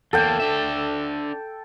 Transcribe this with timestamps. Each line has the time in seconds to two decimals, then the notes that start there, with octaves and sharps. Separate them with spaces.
0.13 E2 A#3 A4 G5
0.40 D4 E5